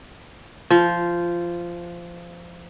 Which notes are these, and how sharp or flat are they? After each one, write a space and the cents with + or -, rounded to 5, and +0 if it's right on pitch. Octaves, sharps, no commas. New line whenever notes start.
F3 -15